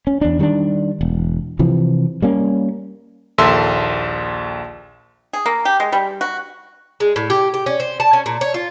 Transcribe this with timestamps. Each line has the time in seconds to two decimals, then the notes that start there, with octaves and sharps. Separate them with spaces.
0.07 C#4
0.21 E2 D4
0.39 D#3 G3 C4 D4
1.01 E1
1.59 C3 E3 F3
2.22 G3 A#3 C#4
3.38 A#1 D#2 A4 E5 C6 E6
5.33 G#4
5.46 A#3
5.65 G4
5.80 G#3
5.92 G3
6.21 F#4
7.00 G#3
7.16 A2
7.30 G4
7.54 G4
7.66 C#4
7.80 C5
8.00 A5
8.13 C#4
8.26 A#2
8.41 C#5
8.54 F4